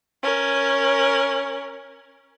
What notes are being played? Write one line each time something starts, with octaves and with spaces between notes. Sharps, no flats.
C#4 A#4